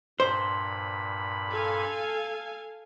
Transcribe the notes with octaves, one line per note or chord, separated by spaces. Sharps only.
G2 A#2 C5 B5
A4 F5 G#5